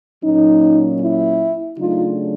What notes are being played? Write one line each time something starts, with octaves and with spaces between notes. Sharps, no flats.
A#2 F#3 A#3 C#4 D#4
E4
C#3 F#3 A3 D4 D#4 F4